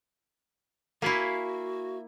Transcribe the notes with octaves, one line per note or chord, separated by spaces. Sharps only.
A#3 E4 F#4 E5 F5 G#5